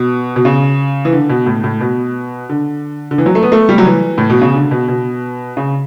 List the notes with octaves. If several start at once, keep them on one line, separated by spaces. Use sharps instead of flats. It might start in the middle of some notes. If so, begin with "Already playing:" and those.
Already playing: B2
B2
C#3
E3
D3
B2
A2
A2
B2
D3
D3
E3
F#3
A3
B3
A3
G3
F#3
E3
A2
B2
C#3
D3
B2
B2
C#3